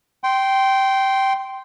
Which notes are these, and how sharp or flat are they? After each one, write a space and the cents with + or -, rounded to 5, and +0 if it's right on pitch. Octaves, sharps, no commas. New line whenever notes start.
G5 -15 C6 +0